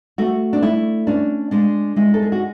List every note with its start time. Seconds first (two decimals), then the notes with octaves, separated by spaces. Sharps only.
0.18 A3 F#4
0.53 D4
0.62 A3 E4
1.07 C#4 D4
1.51 G#3 D4
1.96 G#3 E4
2.14 A4
2.22 G#4
2.32 F#4